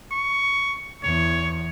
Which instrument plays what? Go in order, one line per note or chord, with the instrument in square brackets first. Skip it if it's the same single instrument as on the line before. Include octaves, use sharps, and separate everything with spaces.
[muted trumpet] C#6
[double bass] E2 [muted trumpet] C#5